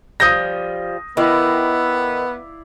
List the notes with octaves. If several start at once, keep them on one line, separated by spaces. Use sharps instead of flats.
F3 G3 D#6 G6 A#6
D#3 B3 E4 D5 F5